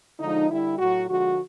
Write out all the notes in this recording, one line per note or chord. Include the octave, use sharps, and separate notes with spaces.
D3 F3 G#3 D#4
D3 G3 E4
A2 F#3 F#4
D3 F3 G#3 F#4